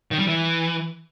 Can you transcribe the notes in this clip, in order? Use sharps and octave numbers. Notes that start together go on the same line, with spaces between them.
D#3
G3
E3